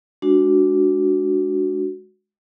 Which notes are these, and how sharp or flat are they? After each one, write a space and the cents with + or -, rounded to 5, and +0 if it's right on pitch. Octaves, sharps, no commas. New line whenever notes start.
G#3 +0 D4 +0 F#4 +0